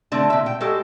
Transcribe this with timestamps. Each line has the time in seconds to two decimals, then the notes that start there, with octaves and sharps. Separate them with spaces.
0.12 D3 A3 C4 D5 A5
0.30 A#2 E5
0.46 G5
0.60 G#3 F#4 G4 A4